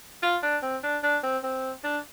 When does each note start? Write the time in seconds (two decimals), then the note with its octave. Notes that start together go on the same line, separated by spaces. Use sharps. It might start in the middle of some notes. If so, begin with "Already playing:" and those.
0.23 F4
0.43 D4
0.63 C4
0.83 D4
1.03 D4
1.24 C4
1.43 C4
1.84 D4